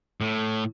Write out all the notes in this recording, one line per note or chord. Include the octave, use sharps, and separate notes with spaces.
A2